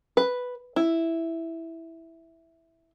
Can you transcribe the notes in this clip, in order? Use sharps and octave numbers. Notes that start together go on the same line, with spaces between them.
B4
E4